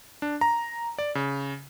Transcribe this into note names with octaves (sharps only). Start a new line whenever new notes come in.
D4
A#5
D5
C#3